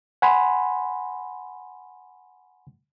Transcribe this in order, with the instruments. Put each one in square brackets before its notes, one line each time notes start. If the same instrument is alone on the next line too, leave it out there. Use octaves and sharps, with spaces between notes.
[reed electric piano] F#5 G#5 B5 C6